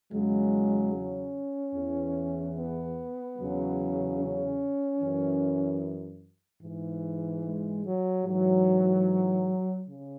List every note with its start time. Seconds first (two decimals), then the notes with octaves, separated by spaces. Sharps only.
0.11 E2 C#3 F#3 G#3
0.93 C#4
1.73 E2 E3
2.55 B3
3.37 E2 C#3 F#3
4.18 C#4
4.99 F#2 E3
6.62 G#2 E3
7.43 G#3
7.84 F#3
8.25 G#2 E3 F#3
9.88 C#3